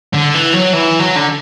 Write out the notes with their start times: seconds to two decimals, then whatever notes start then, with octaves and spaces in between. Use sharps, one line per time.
0.13 D3
0.34 E3
0.53 F#3
0.73 E3
1.00 F#3
1.16 D3